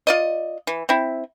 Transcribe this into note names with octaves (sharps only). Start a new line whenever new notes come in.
F4 D5 D#5
E3
C4 E4